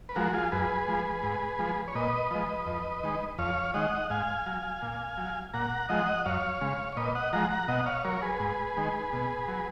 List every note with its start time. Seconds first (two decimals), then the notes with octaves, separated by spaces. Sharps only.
0.09 B4
0.15 F3 G#3 F#4 A#4
0.33 F4 G#4
0.52 F#2 G#4 B4
0.88 F3 G#3
1.23 G#2
1.59 F3 G#3
1.88 C#5
1.95 A#2 B4 D#5
2.31 F3 G#3
2.66 F2
3.03 D#3 G#3
3.38 F2 C#5 F5
3.74 D#3 G#3 D#5 F#5
4.10 G#2 F5 G#5
4.46 F#3
4.82 A#2
5.17 F#3
5.54 A#2 F#5 A#5
5.89 F3 G#3 D#5 F#5
6.25 F#2 C#5 F5
6.61 C#3 G#3
6.92 C#5
6.96 A#2 B4 D#5
7.15 D#5 F#5
7.33 F3 G#3 F#5 A#5
7.50 F#5 A#5
7.68 B2 D#5 F#5
7.86 C#5 F5
8.04 F#3 A#4 C#5
8.22 G#4 B4
8.40 G#2
8.77 D#3 G#3
9.13 B2
9.48 F#3